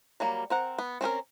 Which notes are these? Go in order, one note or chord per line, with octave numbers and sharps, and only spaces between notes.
F#3 G3 A#3
C4 A#4 F#5
B3
C4 C#4 D#4 A#4